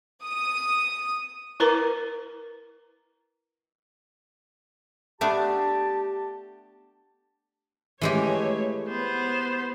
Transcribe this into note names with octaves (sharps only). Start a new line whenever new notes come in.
D#6
E4 A#4 B4 A#5 D6
A3 B3 D4 G4 A5
E3 G#3 A3 G4 C#5
B3 C5